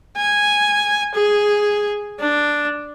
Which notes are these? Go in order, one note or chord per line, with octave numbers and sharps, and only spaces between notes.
G#5
G#4
D4